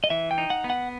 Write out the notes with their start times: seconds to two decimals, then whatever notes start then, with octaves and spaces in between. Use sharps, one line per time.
0.04 D#5
0.10 E3 E5
0.31 G5
0.38 D#4
0.50 F#5
0.64 B3
0.70 F#5